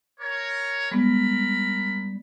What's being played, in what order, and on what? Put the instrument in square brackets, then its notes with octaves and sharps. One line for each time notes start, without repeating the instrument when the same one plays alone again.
[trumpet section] A#4 C#5
[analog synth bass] G3 [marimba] G#3 B3 [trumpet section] A#4 B5